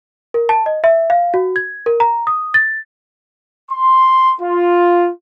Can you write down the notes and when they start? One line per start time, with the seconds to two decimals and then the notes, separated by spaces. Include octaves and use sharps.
0.34 A#4
0.49 A5
0.66 D#5
0.84 E5
1.10 F5
1.34 F#4
1.56 G#6
1.86 A#4
2.00 A#5
2.27 D#6
2.54 A6
3.71 C6
4.41 F4